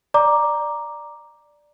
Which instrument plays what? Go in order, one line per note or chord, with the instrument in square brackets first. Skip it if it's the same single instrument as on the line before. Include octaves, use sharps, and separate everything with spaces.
[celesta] D5 A#5 D6